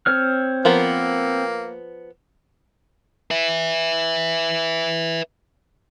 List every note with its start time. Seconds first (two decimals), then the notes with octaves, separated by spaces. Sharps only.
0.06 C4 C#5 F6
0.65 F3 A#3 B3 A#4
3.31 B4 E5